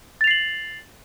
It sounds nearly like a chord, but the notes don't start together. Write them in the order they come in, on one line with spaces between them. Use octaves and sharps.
A6 F7 C7 F#7